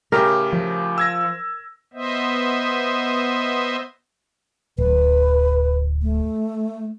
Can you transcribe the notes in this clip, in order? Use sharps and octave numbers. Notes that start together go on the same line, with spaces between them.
A2 C#3 G4 A#4
F3
E6 G#6 A#6
B3 C5 D#5 E5
D1 B4
A3